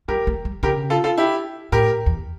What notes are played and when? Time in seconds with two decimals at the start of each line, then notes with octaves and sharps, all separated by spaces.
0.08 G3 G4 A#4
0.27 A3
0.45 G3
0.63 C#3 G4 A#4
0.90 F4 A4
1.04 F4 A4
1.17 E4 G4
1.72 A2 G4 A#4
2.06 E2